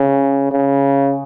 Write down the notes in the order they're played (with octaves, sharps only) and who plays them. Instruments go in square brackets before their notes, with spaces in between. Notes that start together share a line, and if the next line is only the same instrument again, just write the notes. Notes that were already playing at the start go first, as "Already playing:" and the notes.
Already playing: [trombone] C#3
C#3